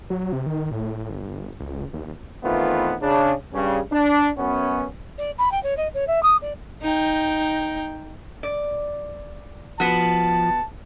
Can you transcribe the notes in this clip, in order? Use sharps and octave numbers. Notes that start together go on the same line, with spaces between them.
F#3
C3
D#3
A2
G1
C#2
D#2
D#3 E3 A3 B3 C4 F4
C#3 D4
G2 C#3
D4
F#2 B3 C#4
D5
B5
G5
C#5
D#5
C#5
E5
D#6
D5
D#4 G5
D5
F3 B3 F#4 A5